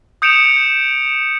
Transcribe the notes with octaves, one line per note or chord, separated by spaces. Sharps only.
D#6 G6 C#7 D7 E7 F7